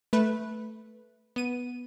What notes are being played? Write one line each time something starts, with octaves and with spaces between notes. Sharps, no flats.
A3 B4
B3 D#7